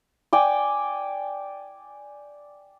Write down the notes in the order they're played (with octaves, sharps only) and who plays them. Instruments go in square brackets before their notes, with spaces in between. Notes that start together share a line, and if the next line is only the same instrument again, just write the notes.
[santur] D5 G5 G#5